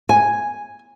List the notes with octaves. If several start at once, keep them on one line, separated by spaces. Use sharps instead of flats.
G#5